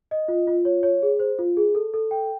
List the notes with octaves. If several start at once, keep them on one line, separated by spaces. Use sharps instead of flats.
D#5
F4
F4
C#5
C#5
G#4
C5
F4
G#4
A4
A4
G5